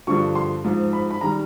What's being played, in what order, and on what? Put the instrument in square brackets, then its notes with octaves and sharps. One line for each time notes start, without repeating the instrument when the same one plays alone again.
[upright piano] G2 D3 F3 C#6
C6
G#2 F3
B5
B5
D#3 G3 A#5